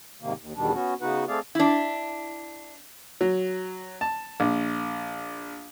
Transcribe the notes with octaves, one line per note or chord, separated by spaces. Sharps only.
G#2 C3 D#3 A#3
D#2
E2 B2 D#3 G3 D4
B3 C#4 F#4
C#3 B3 D#4 F#4 B4 F#5
A3 C4 G#4 D5 F5
D4 E4
F#3
A5
A#1